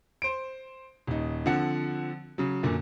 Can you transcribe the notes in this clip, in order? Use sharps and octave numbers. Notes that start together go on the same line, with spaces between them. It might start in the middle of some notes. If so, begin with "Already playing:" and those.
C5 D7
D#1 D#4
D3 F3 C4 F#5
C#3 F#3
F#2 A#2 D3